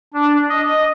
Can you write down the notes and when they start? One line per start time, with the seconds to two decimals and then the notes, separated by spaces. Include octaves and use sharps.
0.14 D4
0.49 D#5